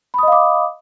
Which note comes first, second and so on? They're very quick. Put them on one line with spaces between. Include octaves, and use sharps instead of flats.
B5 D#6 D#5 F5 D6